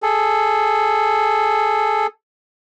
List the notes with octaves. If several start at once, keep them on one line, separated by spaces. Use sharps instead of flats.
G#4 A4